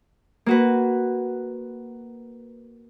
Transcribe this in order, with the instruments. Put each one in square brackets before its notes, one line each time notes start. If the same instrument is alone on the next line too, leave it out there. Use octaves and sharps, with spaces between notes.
[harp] A#3 F#4 B4